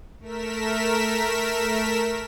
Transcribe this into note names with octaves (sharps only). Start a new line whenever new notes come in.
A3 A#4 B6 E7